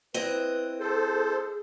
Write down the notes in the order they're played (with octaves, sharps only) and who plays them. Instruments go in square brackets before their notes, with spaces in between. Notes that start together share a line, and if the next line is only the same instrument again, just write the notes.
[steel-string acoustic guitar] C4 E4 D#5 [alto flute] B4
[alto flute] G#4 [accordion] A4 C5